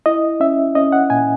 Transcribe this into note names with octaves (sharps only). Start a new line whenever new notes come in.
E4 D#5
C#4 E5
C#4 D#5
F#5
A#2 G#5